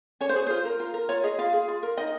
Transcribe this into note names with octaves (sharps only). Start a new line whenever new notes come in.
C#4 C#5
C5
G#4
F4 C5
A#4
F4
A#4
F4 C#5
G#4 D#5
F4 F5
G#4
F4
A#4
D#4 D#5